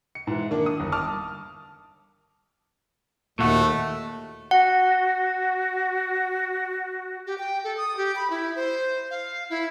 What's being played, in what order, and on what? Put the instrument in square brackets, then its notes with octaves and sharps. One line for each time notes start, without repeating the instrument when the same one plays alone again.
[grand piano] C#7
G#2 E3
D#3 A#3 D4
D#6
G1
A5 D6 D#6 F6
[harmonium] D#2 [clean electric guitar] A#2 F#4 [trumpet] A3
[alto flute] F#4 [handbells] F#5
[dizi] G4
G5
A4
D#6
G4
B5
E4
C5
F5
E4